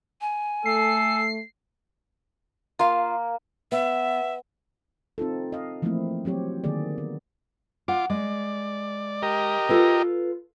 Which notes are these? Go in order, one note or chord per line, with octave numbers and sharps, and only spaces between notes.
G#5
A3 A4 C7
A#3 F4 F5
B3 E5
C4 D#4 F4 A4
D#5 F5
E3 F3 A3 A#3 C4 E4
F#3 C4 G4 C#5
D3 D#3 A#3 G#4 D5
B3
F4 F#5 D6
G#3 D5
G4 A#4 D#5
F4 A4 B4